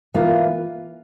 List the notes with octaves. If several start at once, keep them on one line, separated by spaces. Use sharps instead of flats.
E3 A#3 F4